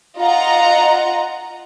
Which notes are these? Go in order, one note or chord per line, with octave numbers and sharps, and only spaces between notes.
F4 D#5 F#5 A#5